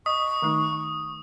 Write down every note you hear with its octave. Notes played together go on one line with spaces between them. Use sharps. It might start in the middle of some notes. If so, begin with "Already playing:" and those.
D#5 C#6 D#6
D#3 A3 D#4